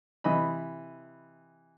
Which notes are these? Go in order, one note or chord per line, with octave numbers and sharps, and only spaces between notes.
C3 E3 D#5 B5